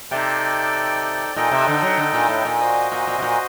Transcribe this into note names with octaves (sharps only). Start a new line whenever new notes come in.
C3 D#4 A4 D5 G5
A#2 D#4 A4 D#5 G5
C3
D3
F#3
D3
A#2
A2
A#2
F#4 C5 D#5
A#2
A#2
C3
A#2